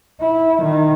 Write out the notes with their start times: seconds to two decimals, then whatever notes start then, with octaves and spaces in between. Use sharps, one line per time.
0.21 E4
0.63 D#3